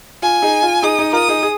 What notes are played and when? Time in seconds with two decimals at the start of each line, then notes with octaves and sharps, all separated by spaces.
0.22 F4 G#5
0.42 D#4 G#4
0.63 F4
0.83 D#4 G#4 D#6
0.99 D#4 G#4
1.13 F4 A#4 D#6
1.28 D#4 G#4
1.43 G#4